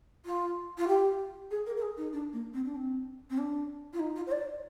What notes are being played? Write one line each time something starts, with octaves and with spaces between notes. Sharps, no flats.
F4
F4
G4
G#4
A#4
A#4
G#4
D#4
D4
A#3
C4
D4
C4
C4
D4
F4
D#4
F4
C5
D5